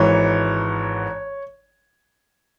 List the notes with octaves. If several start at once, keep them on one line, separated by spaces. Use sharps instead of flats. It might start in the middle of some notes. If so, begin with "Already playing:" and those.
Already playing: G#1 G#2 E3 C#5